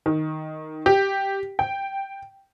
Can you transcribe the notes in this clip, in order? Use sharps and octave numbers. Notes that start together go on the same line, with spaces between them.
D#3
G4
G5